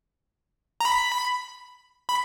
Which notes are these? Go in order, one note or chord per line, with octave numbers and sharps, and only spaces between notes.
A#5
B5
B5